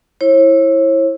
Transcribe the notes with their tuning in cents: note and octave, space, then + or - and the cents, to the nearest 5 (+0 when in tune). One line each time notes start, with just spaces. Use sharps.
E4 +0 C#5 -40